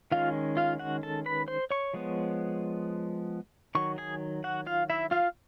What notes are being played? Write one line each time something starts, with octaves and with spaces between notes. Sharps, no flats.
D#3 G#3 C#4 F4 F5
F4 F5
F#4 F#5
A4 A5
B4 B5
C5 C6
C#5 C#6
F3 G#3 B3
D#3 F#3 C#6
G#4 G#5
F#4 F#5
F4 F5
E4 E5
F4 F5